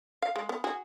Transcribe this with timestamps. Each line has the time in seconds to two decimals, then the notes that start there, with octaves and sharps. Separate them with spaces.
0.22 F5
0.36 G#3
0.49 B3
0.64 F#4 G#4